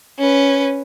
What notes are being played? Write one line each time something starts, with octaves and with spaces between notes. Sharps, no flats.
C#4 B4